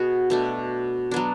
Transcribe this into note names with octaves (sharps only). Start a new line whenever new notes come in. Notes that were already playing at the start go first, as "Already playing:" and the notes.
Already playing: B2 B3 F#4 G#4
B2 A3 D4
F#3 B3 D4